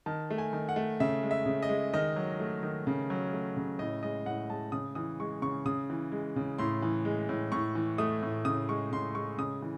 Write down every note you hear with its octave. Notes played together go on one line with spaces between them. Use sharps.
D#3 A5
A3
G#5
D#3
F#5
A3
C#3 E5
G#3
E5
C#3
D#5
G#3
D#3 D#5
F#3
A3
D#3
C#3
F#3
A3
C#3
A2 D#5
G#3 D#5
A2 F#5
G#3 A5
C#3 D#6
E3 D#6
G#3 C#6
C#3 C#6
C#3 D#6
E3
G#3
C#3
A2 C6
E3
G#3
A2
A2 C#6
E3
A3 D#6
A2
C#3 D#6
G#3 C#6
C#3 C6
G#3 C#6
C#3 D#6
E3